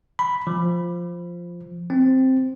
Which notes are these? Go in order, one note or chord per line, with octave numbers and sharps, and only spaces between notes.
B5
F3
C4